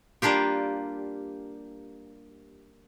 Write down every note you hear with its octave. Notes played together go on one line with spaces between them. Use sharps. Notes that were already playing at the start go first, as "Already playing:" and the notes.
G3 A#3 D4 F4 G4